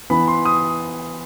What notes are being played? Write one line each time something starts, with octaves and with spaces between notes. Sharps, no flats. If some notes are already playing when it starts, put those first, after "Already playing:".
E3 B3 B5
C6
D#6